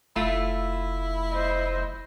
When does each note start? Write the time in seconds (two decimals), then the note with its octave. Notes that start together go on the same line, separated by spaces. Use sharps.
0.16 F1 A3 E4 F4
1.33 C5 D#5